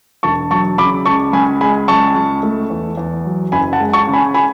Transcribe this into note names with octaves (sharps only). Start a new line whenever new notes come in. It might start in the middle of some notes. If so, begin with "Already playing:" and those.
E1 A5 C#6
F#3 A5 C#6
C#3 B5 D6
C#2 A5 C#6
C#2 G#5 B5
G#3 G#5 B5
C#2 A5 C#6
C#2
A3
E2
E2
F#3
F#1 G#5 B5
F#5 A5
G#3
A5 C#6
C#3
G#5 B5
G#5 B5